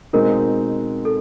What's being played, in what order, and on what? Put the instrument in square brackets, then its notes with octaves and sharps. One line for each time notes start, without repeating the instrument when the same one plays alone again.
[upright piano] B2 G#3 C4 D#4 [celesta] A#4
[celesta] A4